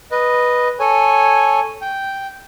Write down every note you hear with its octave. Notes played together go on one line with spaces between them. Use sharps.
B4 D#5
A4 C#5 G#5
G5